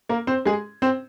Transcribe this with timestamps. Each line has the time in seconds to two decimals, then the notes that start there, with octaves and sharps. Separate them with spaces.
0.09 A#3 A#4
0.27 C4 C5
0.45 G#3 G#4
0.82 C4 C5